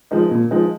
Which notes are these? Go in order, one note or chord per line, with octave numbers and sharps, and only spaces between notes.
F3 G#3 D#4
A#2
F3 G#3 D#4